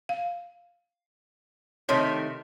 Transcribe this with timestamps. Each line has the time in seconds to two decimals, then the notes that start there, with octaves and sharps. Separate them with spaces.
0.09 F5
1.89 C3 D#3 A3 C#5